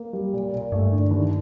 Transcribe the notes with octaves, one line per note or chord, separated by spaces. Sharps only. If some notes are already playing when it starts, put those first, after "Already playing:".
Already playing: A#3
G3
A#2
A#2
G2 A3
D3
D#2